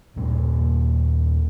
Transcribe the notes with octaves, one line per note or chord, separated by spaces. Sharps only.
D#2 A#2 A#3 D4